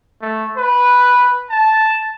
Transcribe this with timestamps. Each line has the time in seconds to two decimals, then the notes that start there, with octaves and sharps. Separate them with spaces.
0.22 A3
0.58 B4
1.51 A5